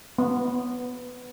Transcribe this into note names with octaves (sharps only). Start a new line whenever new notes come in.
B3